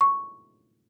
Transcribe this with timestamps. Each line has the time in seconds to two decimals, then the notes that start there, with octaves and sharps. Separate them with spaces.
0.01 C#6